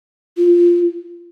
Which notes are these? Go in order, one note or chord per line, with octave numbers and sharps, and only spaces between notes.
F4